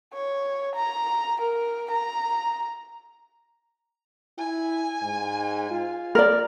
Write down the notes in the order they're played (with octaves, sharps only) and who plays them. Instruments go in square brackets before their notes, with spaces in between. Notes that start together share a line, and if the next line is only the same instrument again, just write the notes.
[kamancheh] C#5
A#5
A#4
A#5
[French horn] E4 [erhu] G#5
[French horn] G#2
F4
[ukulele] A#4 D5